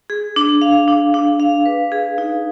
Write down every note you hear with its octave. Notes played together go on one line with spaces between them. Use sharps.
G#4
D4
F5
D4
D4
F5
B4
G#4
D#4